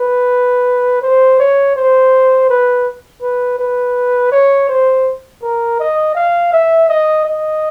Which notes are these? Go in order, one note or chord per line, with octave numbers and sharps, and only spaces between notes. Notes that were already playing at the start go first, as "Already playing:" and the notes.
Already playing: B4
C5
C#5
C5
B4
B4
B4
C#5
C5
A#4
D#5
F5
E5
D#5
D#5